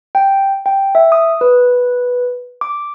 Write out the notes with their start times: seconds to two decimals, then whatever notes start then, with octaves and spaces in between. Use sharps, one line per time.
0.15 G5
0.66 G5
0.95 E5
1.12 D#6
1.41 B4
2.61 D6